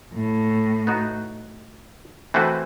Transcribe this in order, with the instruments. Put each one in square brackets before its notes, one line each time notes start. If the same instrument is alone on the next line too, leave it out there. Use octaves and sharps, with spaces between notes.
[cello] A2
[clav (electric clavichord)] B3 D#4 F#4
E3 A3 C4 F#4 B4